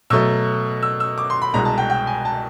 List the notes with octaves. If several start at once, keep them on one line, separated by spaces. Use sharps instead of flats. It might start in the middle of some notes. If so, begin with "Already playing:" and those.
B2 F#3 A3 E6
E6
E6
D6
C6
B5
C2 B2 G#3 A#5
A5
G5
G5
G#5
A5